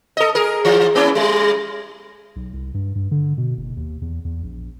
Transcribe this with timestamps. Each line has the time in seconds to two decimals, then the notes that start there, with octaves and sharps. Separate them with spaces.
0.17 A4 D#5
0.35 G#4 A#4
0.65 E3
0.95 A#3 C#4 E4
1.15 G3 G#3
2.36 B1
2.53 C2
2.74 G2
2.95 G2
3.11 D3
3.37 B2
3.57 F#1
3.77 D#2
4.02 E2
4.25 E2
4.43 A#1